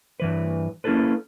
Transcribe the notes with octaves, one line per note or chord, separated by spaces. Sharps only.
G2 E3 B4
A#3 C#4 E4 G#4 A4 B4